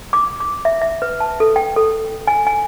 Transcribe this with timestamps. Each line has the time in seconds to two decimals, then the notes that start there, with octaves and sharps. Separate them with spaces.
0.13 D6
0.40 D6
0.65 E5
0.82 E5
1.02 B4
1.20 A5
1.40 A4
1.56 G5
1.76 A4
2.27 G#5
2.47 G#5